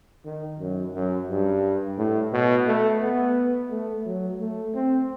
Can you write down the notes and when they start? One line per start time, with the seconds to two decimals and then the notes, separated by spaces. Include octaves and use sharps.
0.25 D#3
0.59 F#2
0.94 F#2
1.29 G2
1.97 A2
2.32 B2
2.67 A3
3.02 B3
3.70 A3
4.06 F#3
4.39 A3
4.75 C4